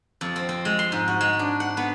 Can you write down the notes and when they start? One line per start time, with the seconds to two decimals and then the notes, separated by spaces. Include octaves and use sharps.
0.21 F2
0.36 C4
0.49 C4
0.65 G#3
0.79 C6
0.92 G#2
1.08 F#4
1.21 G#3
1.39 D4
1.60 F#5
1.77 B3